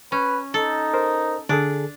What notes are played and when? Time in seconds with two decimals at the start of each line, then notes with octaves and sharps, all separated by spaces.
0.12 C#4 B4
0.54 D#4 A4
0.94 A#4 C5
1.49 D3 D4 G#4 A4